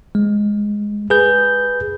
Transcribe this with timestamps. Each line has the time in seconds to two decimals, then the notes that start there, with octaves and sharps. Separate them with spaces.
0.15 G#3
1.10 G#4 B4 G6